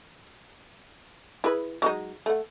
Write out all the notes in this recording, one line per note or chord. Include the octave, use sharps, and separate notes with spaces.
E4 G#4 B4
F#3 G#3 D#4
A3 F#5